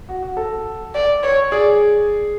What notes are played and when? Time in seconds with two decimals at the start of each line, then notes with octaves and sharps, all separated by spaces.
0.09 F#4
0.23 F#4
0.37 A4
0.95 D5
1.23 C#5
1.52 G#4 D5